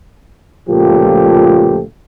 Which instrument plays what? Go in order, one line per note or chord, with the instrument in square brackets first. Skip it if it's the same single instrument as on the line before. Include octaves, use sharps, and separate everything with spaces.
[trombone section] C#2 A#2 F3 A3 G4